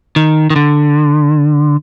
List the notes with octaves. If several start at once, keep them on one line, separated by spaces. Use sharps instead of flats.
D#3
D#3
D3